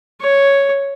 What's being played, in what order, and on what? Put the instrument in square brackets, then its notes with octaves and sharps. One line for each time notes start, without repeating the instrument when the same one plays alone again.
[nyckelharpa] C#5